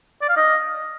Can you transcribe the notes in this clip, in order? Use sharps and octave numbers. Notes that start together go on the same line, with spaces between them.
D5
F5
D#5